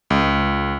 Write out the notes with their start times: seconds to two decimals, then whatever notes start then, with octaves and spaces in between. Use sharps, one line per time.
0.10 C#2